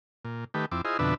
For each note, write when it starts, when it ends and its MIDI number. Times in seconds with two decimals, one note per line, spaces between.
0.25 0.44 46
0.54 0.66 51
0.54 0.66 57
0.54 0.66 67
0.54 0.66 71
0.72 0.81 41
0.72 0.81 60
0.72 0.81 64
0.72 0.81 86
0.85 0.97 64
0.85 0.97 65
0.85 0.97 68
0.85 0.97 72
0.85 0.97 75
0.99 1.14 41
0.99 1.14 47
0.99 1.14 50
0.99 1.14 62
0.99 1.14 71
0.99 1.14 76